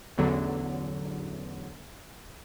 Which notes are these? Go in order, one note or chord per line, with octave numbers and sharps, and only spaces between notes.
A1 E2 D3 F#3